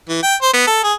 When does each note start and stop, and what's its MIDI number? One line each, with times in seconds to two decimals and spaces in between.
0.09 0.19 52
0.23 0.35 79
0.42 0.53 72
0.53 0.64 59
0.67 0.82 69
0.84 0.93 68